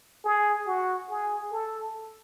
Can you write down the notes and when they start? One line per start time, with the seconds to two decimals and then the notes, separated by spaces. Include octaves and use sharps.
0.24 G#4
0.67 F#4
1.10 G#4
1.52 A4